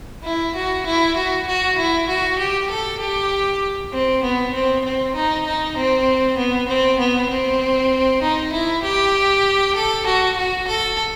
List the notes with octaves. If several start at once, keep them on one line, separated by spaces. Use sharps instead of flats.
E4
F#4
E4
F#4
F#4
E4
F#4
G4
A4
G4
C4
B3
C4
C4
D#4
D#4
C4
B3
C4
B3
C4
D#4
E4
G4
A4
F#4
F#4
A4